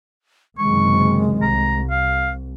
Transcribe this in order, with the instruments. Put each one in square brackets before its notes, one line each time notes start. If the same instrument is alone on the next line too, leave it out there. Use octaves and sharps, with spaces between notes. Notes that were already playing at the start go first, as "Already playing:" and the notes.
[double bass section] F#1 C3 D#3 [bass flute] G#3 [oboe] C#6
[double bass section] C2 [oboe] A#5
[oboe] F5